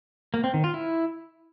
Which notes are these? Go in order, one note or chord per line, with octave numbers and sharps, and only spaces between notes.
A#3
C4
D#3
F4
E4